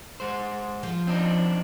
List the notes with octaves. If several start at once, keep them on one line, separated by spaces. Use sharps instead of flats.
G#3 C5
F3
C4 D4 D#4